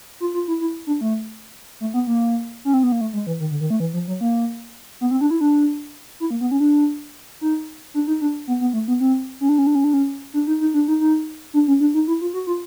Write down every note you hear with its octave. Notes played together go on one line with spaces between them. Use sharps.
F4
F4
E4
E4
D4
A3
A3
B3
A#3
C#4
C4
B3
A#3
A3
G#3
E3
D#3
D3
D#3
A3
E3
F3
F#3
A#3
B3
C4
D4
E4
D4
E4
A#3
B3
C#4
D4
D#4
D4
D#4
D4
B3
B3
A3
B3
C4
C#4
D4
C#4
D4
C#4
D4
C#4
D4
D#4
D#4
D4
D#4
D#4
D4
C#4
D4
D#4
E4
F4
F#4
F4